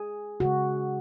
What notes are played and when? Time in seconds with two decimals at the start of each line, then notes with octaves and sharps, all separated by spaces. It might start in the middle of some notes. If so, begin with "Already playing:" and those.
Already playing: G#4
0.40 C#3 G#3 F#4